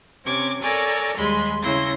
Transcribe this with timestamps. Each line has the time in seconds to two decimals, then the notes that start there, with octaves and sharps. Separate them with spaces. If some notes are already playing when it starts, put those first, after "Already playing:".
0.23 C3 C#4 D6 G#6
0.61 A4 A#4 C#5 D5 G#5
1.15 D#2 G3 G#3 B5 C6
1.61 C#3 E4 C6 A#6